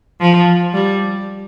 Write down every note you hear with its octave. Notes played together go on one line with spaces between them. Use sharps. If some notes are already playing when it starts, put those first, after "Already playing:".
F3
G3